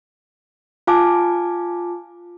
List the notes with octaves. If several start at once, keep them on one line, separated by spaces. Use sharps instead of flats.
F4 F5 G#5 A5 D6